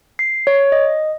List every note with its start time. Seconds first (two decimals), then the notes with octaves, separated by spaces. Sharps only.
0.19 C7
0.47 C#5
0.72 D#5